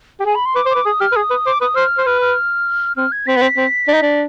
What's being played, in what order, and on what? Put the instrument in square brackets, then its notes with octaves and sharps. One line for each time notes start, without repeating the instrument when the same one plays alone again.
[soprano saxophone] G4
[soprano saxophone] G#4 [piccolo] G#5
[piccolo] B5
C6
[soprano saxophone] B4 [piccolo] D6
[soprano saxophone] C5
[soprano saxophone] B4 [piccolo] D6
[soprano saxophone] G#4 [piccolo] D#6
[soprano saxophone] G4 [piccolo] F6
[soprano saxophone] B4
[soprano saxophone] G#4 [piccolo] D#6
[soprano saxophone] B4
[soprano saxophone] C5 [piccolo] D6
[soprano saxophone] B4 [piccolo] D#6
[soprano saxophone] C5 [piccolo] F6
[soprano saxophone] C5
[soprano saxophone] B4 [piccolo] F6
[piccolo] F6
[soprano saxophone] C4 [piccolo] F6
[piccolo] G#6
[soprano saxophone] C4 [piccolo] B6
[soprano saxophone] B3
C4
C4
D4
D#4
D4